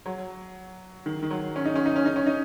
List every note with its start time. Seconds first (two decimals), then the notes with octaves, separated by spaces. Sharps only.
0.06 F#3
1.06 D#3
1.23 D#3
1.31 F#3
1.56 C#4
1.65 D#4
1.76 C#4
1.86 D#4
1.96 C#4
2.06 D#4
2.16 C#4
2.27 D#4